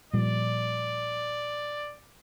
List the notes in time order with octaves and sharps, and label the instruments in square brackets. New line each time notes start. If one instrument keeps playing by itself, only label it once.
[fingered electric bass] A#2 F3 G3 [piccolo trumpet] D5